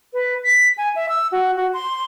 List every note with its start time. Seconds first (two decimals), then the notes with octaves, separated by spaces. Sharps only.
0.13 B4
0.43 B6
0.78 G#5
0.95 E5
1.09 E6
1.32 F#4
1.57 F#4
1.73 C6